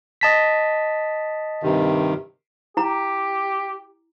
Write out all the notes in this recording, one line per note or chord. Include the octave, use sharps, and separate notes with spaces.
D#5 A5 B6
G2 C3 D#3
E4 G4 A#5